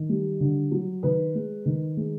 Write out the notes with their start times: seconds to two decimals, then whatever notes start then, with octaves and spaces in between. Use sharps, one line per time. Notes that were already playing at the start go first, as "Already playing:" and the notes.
Already playing: D#3
0.09 G3
0.40 D3
0.71 F#3
1.03 D#3 B4
1.35 G#3
1.66 D#3
1.97 G#3